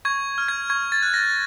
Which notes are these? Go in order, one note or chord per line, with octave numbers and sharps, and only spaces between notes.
C#6 G#6
F6
G#6
C#6 G#6
A6
F#6
A#6